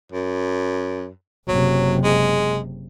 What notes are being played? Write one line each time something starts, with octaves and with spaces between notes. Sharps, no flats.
F#2
F#1 C3 F#3
G#3